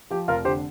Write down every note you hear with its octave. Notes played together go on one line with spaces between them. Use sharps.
F3 G4
F1 F4 A#4
D3 G4 C5